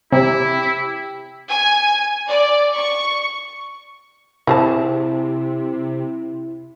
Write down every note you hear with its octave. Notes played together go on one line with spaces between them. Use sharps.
C3 E4 G4
G#5
D5
C#6
C3 C4 E4 G#4 A5